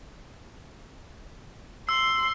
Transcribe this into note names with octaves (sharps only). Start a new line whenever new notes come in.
C6 E6